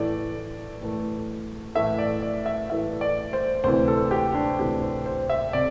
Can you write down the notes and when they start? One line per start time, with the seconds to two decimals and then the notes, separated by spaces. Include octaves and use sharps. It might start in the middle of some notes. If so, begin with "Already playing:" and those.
Already playing: A2 E3 A3 D5
0.81 A2 E3 A3
1.75 A2 E3 A3 E5
1.99 D5
2.22 D5
2.46 E5
2.70 A2 E3 A3 E5
3.01 D5
3.33 C5
3.64 D2 C3 E3 C5
3.88 A4
4.11 G4
4.35 D4
4.59 D2 C3 E3 G4
4.82 C5
5.06 C5
5.30 E5
5.53 C3 D5